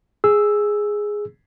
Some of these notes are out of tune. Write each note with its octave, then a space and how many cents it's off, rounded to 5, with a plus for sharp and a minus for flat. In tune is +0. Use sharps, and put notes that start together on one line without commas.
G#4 +0 E6 +0